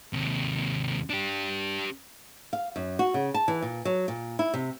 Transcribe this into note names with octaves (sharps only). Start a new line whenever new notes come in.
D#2 C3
D4 G4
F5
F#2
F#4
C#3
A5
E3
A#2
F#3
A#2
E4
C3